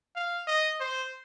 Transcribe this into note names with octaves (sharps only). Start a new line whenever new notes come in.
F5
D#5
C5